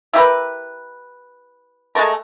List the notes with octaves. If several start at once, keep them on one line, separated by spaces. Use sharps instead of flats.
E4 G4 A#4 B4
G#3 A3 A4 A#4